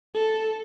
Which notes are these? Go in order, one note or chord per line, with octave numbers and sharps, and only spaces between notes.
A4